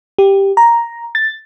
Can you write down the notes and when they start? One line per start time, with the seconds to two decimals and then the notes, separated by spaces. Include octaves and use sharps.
0.18 G4
0.57 A#5
1.15 A6